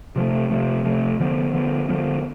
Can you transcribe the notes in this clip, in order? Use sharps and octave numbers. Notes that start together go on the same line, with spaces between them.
C3 F3 A3
C3 F3 A3
C3 F3 A3
D3 F3 B3
D3 F3 B3
D3 F3 B3